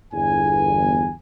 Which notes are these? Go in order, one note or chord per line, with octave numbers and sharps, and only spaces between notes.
G1 E2 G#5